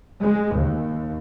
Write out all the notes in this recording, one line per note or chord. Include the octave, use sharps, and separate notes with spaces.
G#3
D#2